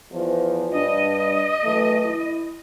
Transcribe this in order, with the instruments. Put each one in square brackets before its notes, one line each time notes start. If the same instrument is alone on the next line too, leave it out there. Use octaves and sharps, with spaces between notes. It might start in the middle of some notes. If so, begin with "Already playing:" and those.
[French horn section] E2 F3 F4
[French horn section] G2 D4 [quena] D#5
[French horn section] F#2 E3 A3
E4